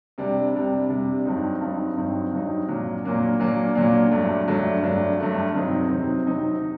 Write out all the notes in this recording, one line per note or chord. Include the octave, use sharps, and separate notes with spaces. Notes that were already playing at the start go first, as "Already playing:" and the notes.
C3 G3 D4
C3 G3 D4
C3 G3 D4
G2 F#3 C4 D#4
G2 F#3 C4 D#4
G2 F#3 C4 D#4
G2 F#3 C4 D#4
A#2 F#3 A#3 D4
A#2 F#3 A#3 D4
A#2 F#3 A#3 D4
A#2 F#3 A#3 D4
G2 F#3 A3 D4
G2 F#3 A3 D4
G2 F#3 A3 D4
G2 F#3 A3 D4
C3 F#3 C4 D#4
C3 F#3 C4 D#4
C3 F#3 C4 D#4
C3